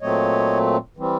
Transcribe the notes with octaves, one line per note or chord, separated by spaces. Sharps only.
A#2 F#3 A3 C4 C#5 D#5
E3 G3 C4